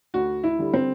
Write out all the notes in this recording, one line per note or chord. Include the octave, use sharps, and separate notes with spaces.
D2 F#4
E4
D3 G3
C4